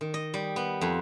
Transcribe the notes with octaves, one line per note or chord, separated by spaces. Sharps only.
D#3
D#5
G3
B3
F2